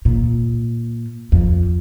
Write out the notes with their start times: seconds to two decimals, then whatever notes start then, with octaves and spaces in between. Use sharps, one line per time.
0.05 A#2
1.32 F2